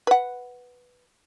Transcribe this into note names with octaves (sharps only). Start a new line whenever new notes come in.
B4 F#5